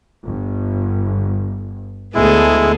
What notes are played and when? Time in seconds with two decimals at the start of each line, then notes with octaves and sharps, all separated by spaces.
0.25 G1
2.15 D2 G#3 B3 E4 G#4 A4